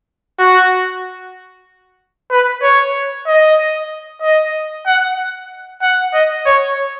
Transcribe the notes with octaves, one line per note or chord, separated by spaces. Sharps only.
F#4
B4
C#5
D#5
D#5
F#5
F#5
D#5
C#5